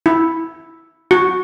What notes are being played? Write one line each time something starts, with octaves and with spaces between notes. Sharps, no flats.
E4
F#4